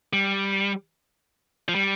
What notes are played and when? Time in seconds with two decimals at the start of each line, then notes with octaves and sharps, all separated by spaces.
0.13 G3
1.68 F3
1.75 G3